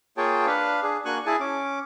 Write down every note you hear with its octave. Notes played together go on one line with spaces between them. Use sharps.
A#3 F4 G#4 C#5 G5 A5
D4 B4 F5
D4 G#4
A#3 D4 F#4 G#5 C#6 F#6
E4 G#4 G#5 A5
C#4 D6